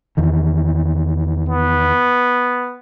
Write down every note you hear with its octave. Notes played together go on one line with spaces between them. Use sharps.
E2 D#3 E3
B3